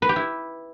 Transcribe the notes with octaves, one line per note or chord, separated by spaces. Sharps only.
B4
G4
E4